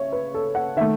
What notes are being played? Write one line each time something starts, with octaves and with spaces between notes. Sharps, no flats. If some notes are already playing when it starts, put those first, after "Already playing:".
Already playing: C#3 C#5 E5
B4
A4
F#5
D#3 A3 E5